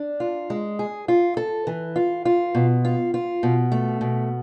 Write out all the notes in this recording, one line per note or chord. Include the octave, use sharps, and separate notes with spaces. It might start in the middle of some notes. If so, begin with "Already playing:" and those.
Already playing: D4
F4
G#3
G#4
F4
A4
E3
F4
F4
B2
F4
F4
B2
A3
B2